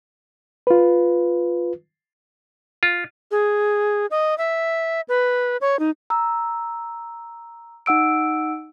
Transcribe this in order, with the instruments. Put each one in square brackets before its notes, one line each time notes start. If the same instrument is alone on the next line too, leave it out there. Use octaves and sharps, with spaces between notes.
[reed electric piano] F4 B4
[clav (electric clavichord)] F4
[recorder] G#4
D#5
E5
B4
C#5
D#4
[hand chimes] A#5 E6
D#4 F#5 E6 D7